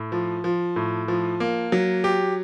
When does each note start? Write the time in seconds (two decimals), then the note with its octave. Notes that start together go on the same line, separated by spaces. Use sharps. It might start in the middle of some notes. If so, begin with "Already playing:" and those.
Already playing: A2
0.12 F3
0.44 F3
0.76 A2
1.08 F3
1.40 A#3
1.72 F#3
2.04 G4